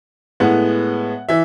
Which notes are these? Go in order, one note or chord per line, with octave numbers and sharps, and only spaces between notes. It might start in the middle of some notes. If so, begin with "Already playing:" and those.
A2 G#3 B3 F#5
E3 E5